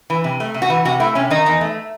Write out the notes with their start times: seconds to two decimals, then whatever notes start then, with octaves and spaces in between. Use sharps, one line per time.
0.10 E3
0.24 C3
0.40 A3
0.54 C3
0.62 F#4
0.70 E3
0.85 C3 F#4
1.00 A3 E4
1.15 C3 C#4
1.30 D#3 D#4
1.46 E2
1.61 A3